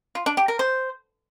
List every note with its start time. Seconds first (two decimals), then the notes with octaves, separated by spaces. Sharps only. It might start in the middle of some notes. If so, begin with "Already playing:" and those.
0.15 F4
0.26 D4
0.37 G4
0.48 A#4
0.59 C5